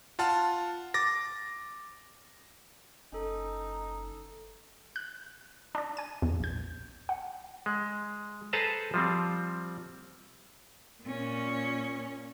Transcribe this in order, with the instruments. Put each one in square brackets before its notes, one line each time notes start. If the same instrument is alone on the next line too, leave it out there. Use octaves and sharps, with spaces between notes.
[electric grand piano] F4 F#5 A5 F6
D6 A6 A#6
[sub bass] F#1 [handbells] C#4 A4 [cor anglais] D#4
[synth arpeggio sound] F#6
D4 D5
G#5 D#7
E2
A#1 G6
F#5
[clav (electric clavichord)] G#3
G#4 A4 B4 C5 A5 A#5
F3 G3 C4
[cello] A#2 C#4